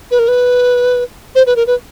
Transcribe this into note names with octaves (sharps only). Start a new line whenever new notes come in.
B4
A#4
B4
C5
B4
A#4
B4